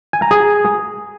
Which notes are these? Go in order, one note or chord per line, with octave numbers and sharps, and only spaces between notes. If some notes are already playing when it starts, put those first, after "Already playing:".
G#5
A#5
G#4